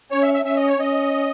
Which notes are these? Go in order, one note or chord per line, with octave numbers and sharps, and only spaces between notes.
C#4 C#5
E5
E5
C#4 E5
D#5
C#5
C#4 D#5